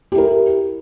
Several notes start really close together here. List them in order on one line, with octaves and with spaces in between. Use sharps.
G4 E4 A#4